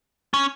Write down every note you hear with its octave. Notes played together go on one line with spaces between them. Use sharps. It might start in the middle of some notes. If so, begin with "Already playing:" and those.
C#4